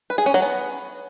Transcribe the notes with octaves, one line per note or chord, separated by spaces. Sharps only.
B4
G#4
C#4
F#3
B3